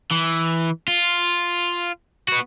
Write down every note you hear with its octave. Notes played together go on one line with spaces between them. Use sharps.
E3
F4
B3 F#4